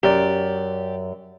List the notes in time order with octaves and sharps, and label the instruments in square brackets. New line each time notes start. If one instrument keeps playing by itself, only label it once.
[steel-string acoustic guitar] F#2 [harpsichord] G4 D5